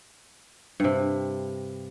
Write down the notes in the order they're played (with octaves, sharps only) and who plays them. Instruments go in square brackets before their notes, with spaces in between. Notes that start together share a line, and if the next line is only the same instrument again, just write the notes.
[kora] G2 C3